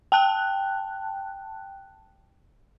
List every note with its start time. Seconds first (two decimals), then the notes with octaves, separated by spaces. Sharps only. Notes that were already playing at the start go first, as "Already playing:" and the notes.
0.12 G5 A5 F#6